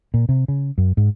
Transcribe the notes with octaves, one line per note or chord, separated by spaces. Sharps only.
A#2
C3
C#3
F#2
G#2